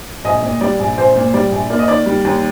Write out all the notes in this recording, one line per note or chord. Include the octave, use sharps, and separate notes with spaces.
A#1 D#5
A#2
G3 D5
A#1
A#1 C5
A#2
G3 D5
A#1
A#3 D5
D#5
D#3 D5
G3
D#2